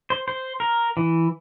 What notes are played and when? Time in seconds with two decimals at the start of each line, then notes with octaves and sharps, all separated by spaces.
0.10 C5
0.28 C5
0.60 A#4
0.97 E3